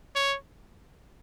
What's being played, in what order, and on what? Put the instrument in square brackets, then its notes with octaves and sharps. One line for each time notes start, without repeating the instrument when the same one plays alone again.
[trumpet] C#5